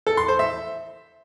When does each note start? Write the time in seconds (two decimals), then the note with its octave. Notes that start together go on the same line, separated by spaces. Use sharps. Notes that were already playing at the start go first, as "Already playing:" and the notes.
0.07 A4
0.17 C6
0.28 C5
0.39 E5